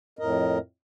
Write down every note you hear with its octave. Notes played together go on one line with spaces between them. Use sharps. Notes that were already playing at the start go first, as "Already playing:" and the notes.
F2 A2 A#4 D#5